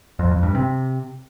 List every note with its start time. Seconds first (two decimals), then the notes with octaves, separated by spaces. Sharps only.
0.19 F2
0.31 F2
0.43 G2
0.55 C3